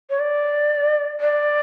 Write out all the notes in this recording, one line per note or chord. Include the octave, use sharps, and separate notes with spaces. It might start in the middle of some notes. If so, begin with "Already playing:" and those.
C#5
D5
D5